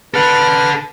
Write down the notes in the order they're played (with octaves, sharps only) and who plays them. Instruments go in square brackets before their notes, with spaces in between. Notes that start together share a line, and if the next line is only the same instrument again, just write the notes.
[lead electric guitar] A4 F#5 [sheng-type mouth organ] B4 F6